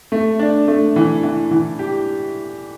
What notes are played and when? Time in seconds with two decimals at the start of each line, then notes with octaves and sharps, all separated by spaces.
0.12 A3
0.39 D4
0.68 A3
0.96 E3
1.23 E3
1.51 E3
1.79 G4